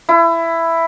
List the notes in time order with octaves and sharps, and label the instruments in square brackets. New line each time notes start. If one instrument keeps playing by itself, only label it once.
[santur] E4